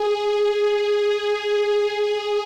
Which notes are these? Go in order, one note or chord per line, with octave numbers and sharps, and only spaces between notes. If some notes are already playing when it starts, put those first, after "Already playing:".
Already playing: G#4
G#4